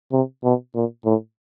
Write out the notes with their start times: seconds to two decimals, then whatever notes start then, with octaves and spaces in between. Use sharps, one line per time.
0.12 C3
0.44 B2
0.75 A#2
1.05 A2